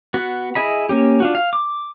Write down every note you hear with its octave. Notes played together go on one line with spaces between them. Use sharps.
B3 F#4
E4 G#4 D#5 B5
A#3 C#4 G4
D4 F4 F#4
F5
D6